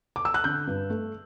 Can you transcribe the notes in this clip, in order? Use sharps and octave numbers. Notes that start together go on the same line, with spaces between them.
D6
E6
F#6
D3 G6
G2
A3